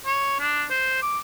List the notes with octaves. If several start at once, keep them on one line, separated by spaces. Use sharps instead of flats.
C#5
D4
C5
D6